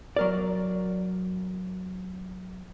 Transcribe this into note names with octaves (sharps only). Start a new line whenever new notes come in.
F#3 A#4 D5